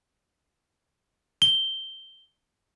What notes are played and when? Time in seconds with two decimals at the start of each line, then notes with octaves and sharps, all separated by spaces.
1.42 G7